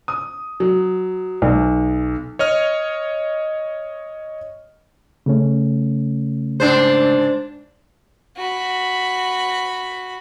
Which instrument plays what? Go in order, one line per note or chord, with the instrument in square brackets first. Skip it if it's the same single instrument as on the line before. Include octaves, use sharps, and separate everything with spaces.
[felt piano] D#6
F#3
B1
[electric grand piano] C#5 D#5 F6
[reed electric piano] C#3 A3 C#4
[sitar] G#2 D4 C5
[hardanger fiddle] F#4 B5